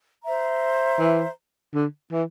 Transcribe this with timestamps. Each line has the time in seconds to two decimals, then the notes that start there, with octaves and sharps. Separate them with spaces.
0.23 C5 E5 A#5
0.99 E3
1.74 D3
2.12 E3